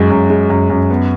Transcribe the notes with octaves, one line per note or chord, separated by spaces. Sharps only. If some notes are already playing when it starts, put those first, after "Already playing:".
Already playing: F#2 G#3
F#2
G#3
F#2
F#2
B3